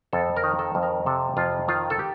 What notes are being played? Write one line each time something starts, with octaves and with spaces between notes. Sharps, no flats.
F2 A4
A#4
D#3
A4
F2
A#4
C3 A4
F2 F4
D#3 F4
A4
G4